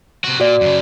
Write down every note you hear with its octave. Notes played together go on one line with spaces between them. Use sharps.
C3 F#4
A#2 F#4 D5
F#2 C#3